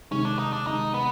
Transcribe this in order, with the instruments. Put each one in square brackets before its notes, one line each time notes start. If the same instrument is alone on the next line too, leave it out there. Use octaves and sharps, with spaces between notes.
[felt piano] C3 D#3 G#3 [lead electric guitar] C#4
[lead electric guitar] D4
D#4
D4
[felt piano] C3 D#3 G#3 [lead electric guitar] D#4
[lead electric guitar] B3